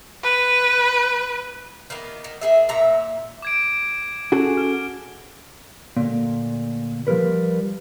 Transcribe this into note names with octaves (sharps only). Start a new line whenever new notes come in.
B4
D#3 A#3 B3
D#3
D#3 G#4 E5
A#2 E5 A#5
D6 G#6 D7
C#4 F#4 G#4 A4
F6
D2 A#2
F3 G3 A#4 B4